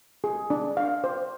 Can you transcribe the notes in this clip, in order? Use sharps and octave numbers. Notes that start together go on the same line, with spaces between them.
G#4
D4
F5
C5